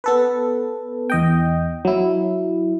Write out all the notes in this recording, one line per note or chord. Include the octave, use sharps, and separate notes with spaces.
B3 A4 B4
E2 D#5 G5
F#3 E4